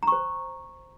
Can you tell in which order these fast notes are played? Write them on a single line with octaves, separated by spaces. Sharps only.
A#5 C#6 C5